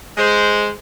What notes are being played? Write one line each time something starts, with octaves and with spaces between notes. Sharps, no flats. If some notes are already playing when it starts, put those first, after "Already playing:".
G#3 C5